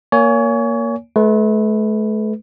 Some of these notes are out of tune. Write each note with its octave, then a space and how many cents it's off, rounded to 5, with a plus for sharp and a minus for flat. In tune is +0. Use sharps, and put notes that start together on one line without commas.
A#3 +0 C#5 +30 G#5 +0
A3 -40 B4 +0